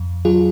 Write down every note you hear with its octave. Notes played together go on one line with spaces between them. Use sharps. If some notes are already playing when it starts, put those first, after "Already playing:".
Already playing: F2
F#3 F4 G#4